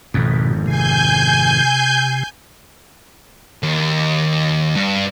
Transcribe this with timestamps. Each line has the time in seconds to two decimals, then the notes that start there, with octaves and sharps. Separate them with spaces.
0.14 G#1 F2 B2
0.66 C3 G#5 G6
3.63 D#2
4.76 G2